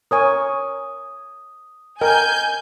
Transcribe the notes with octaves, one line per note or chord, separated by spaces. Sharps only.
A#4 C#5 G#5 D#6
A#4 D#5 G5 G#5 G6